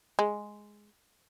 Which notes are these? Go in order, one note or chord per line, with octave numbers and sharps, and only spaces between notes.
G#3